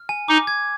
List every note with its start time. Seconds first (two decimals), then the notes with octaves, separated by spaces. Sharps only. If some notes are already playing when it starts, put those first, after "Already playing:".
Already playing: F6
0.09 G#5
0.28 D#4 D6
0.47 G#6